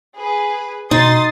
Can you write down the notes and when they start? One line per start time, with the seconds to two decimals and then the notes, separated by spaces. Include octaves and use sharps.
0.15 G#4 B4
0.91 B2 D#4 C6 D#6 A6